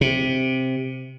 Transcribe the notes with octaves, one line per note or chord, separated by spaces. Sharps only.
C3